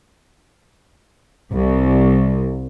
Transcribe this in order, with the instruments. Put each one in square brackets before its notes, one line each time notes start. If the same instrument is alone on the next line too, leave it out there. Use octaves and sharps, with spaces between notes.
[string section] C2